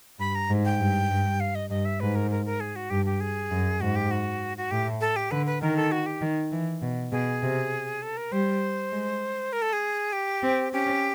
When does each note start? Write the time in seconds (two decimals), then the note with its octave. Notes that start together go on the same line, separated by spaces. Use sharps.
0.19 G2 B5
0.35 A#5
0.50 G#2
0.65 G5
0.80 G2
1.10 G2
1.40 F5
1.55 D#5
1.70 G2 D#5
1.85 E5
2.00 G#2 B4
2.15 A#4
2.31 A#4
2.46 A#4
2.60 G#4
2.76 F#4
2.90 G2 G4
3.06 G4
3.20 G#4
3.51 F#2
3.81 G#2 F#4
3.96 G4
4.11 F#4
4.57 F#4
4.71 A2 G4
5.01 A4
5.16 G4
5.31 D3 B4
5.46 B4
5.61 D#3 A#4
5.77 A4
5.92 F#4
6.06 G4
6.21 D#3
6.52 E3
6.82 B2
7.12 B2 G#4
7.42 C3
8.02 A4
8.17 A#4
8.32 G3 C5
8.92 G#3
9.53 A#4
9.62 A4
9.73 G#4
10.13 G4
10.42 C4
10.73 C#4 G4